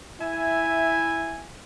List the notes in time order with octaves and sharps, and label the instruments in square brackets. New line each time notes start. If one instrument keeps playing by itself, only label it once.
[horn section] E4 E5 G#5